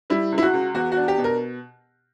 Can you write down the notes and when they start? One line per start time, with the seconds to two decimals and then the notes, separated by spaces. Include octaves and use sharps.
0.10 G3 E4
0.32 C#2
0.38 E4
0.42 F#4
0.53 C#2
0.74 E2 F#4
0.92 F#4
0.97 D4
1.08 G4
1.18 B2
1.24 A#4